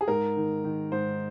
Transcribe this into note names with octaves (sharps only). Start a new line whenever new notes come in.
G#4
G#2 A#4
D#3
D#3
G#2 C5